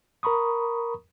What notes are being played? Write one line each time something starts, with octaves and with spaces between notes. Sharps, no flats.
A#4 A#5 B5 C#6 D#6